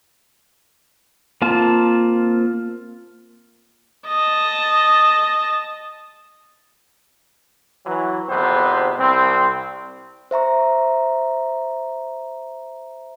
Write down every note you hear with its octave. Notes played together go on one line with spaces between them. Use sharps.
A#3 C4 F4 A5
D#5 A5
E3 F#3
G#1 F2 C3 B3 C5
C2 C4
C5 E5 A#5 C#6